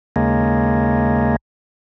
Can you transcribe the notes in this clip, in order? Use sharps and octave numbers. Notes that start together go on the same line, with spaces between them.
D#2 C#3 G#3 A#3